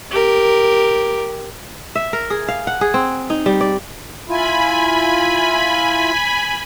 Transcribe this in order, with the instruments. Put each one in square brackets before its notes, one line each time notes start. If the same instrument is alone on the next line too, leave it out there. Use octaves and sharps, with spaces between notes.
[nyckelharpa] G4 A#4
[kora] E5
A#4
G#4
F5
F#5
G#4
C4
D#4
G3
D5
[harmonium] E4 F4 [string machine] G#5 B5